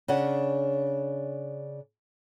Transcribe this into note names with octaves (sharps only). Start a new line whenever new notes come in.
C#3 D4 F#5